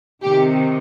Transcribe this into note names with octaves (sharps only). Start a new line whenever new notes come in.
C3 D#3 G4